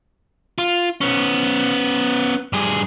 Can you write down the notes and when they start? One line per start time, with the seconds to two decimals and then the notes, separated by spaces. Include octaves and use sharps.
0.58 F4
1.01 B3 C#4
2.53 G2 G#4